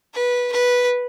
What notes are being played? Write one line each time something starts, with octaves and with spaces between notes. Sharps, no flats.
B4
B4